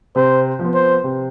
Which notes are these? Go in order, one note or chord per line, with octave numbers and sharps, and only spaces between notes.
C3 C5
F3
B3
C5
C3